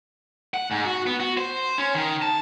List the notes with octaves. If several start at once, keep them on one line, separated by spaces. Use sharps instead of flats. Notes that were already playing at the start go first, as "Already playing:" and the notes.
F#5
G#2
F#4
B3
F#4
C5
C#4
D#3
A5